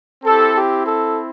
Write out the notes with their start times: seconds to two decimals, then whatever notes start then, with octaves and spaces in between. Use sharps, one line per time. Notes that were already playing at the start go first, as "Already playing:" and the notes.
0.25 C4 E4 G4 A4
0.56 G4
0.86 A4